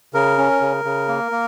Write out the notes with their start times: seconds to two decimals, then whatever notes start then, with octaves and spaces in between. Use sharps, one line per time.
0.14 C#3 A#4
0.38 C#4
0.61 C#3
0.85 C#3
1.08 A#3
1.32 A#3